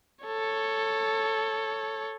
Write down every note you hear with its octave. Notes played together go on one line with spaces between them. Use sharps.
A4 C#5